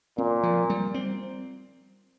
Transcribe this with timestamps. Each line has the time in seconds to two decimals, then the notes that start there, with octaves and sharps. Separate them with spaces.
0.18 A#2 C4
0.43 F3
0.70 G3
0.94 C4